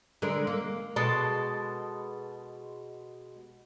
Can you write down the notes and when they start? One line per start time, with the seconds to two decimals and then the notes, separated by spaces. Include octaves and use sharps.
0.22 D3 G#3 A#4
0.47 A#3
0.96 B2 G#3 A4 A5